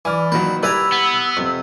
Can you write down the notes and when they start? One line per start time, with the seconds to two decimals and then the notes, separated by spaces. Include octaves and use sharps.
0.05 E3 D5 G#5 D6 F6
0.32 A#2 D#3 F#3 B4
0.63 G3 E4 B4 D5 G#5 A#5 E6
0.92 B3
1.37 F2 C3